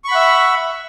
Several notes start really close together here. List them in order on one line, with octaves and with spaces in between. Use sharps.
C#6 B5 F#5 E5